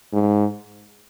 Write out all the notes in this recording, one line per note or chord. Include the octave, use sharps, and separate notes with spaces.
G#2